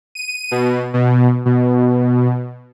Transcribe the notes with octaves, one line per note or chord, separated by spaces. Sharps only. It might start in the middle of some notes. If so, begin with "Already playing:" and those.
D#7
B2
B2
B2